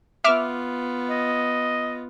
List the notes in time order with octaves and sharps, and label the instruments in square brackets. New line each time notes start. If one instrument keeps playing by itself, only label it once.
[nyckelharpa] B3 F4 [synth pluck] E5 D6 F6
[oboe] D#5